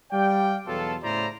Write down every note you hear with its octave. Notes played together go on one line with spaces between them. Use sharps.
G3 D5 F5 G5
E2 B2 F#3 F4 A4
A2 C#3 E4 C5 D5 A#5